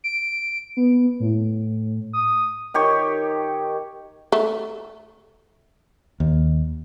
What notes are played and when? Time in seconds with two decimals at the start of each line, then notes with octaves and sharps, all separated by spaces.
0.04 D7
0.77 B3
1.20 A2
2.13 D#6
2.74 D#3 G4 C#5
4.32 A3
6.20 D#2